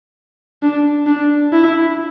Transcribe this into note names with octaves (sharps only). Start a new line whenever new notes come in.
D4
D4
E4